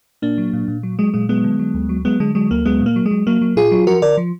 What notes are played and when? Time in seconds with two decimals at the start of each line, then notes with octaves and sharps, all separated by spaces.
0.22 A#2 A#3 D4
0.38 F#3
0.53 A#2
0.68 A#2
0.83 F#3
0.99 F#3 G#3
1.14 A#2 G#3
1.29 F#3 G#3 B3
1.44 D3
1.59 F#3
1.74 D2
1.89 F#3
2.05 F#3 G#3 B3
2.20 D3 G#3
2.35 F#3 G#3
2.51 D2 A#3
2.65 F#3 G#3 B3
2.81 A#2
2.86 A#3
2.96 F#3
3.06 G#3
3.11 F#3
3.27 F#3 A#3
3.42 F#3
3.56 A#2 F4 G#4
3.71 F#3
3.87 F3 F#4 A#4
4.02 D3 A#4 D5
4.17 F3